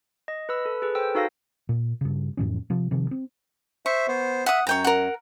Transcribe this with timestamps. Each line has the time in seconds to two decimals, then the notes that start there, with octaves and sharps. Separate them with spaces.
0.28 D#5
0.49 B4 B5 E6
0.66 A4
0.82 G#4 B4
0.95 A4 C5 G5 E6
1.15 D#4 F#4 A4 F5 E6 A#6
1.69 A#2
2.01 G2 C#3
2.37 F2 A2 E3 C#4
2.70 C3 F3
2.91 C3 D#3 F3
3.11 C4
3.86 C5 E5 C#6
4.08 B3 C5
4.46 E5 F#5 D#6
4.67 F#2 C#5 G5 A#5
4.84 A#4 F#5